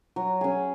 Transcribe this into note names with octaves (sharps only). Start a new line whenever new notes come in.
F#3
C#4 G#4